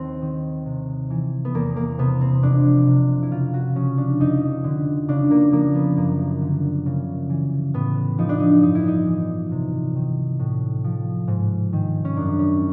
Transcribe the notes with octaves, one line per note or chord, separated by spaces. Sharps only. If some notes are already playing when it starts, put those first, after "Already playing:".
Already playing: D#2 C4
D#3
C3
E3
B3
E2 A#3
A#3
C3 B3
C4
F2 D4
C3
E4
C#3 F4
F#4
F3 C#4
D4
F2 D#4
D3
C#3 D4
A#3
F3 A#3
B3
F#2 A#3
D3
C#3
E3
A2 B3
F3 D#4
D4
D#4
G2 D#4
E4
D#4
E3
C3
D#3
A2
F3
G#2
D#3
C#4
F#2 D4
C#4